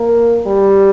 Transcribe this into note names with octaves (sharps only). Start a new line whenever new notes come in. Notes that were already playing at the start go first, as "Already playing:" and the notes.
Already playing: A#3
G3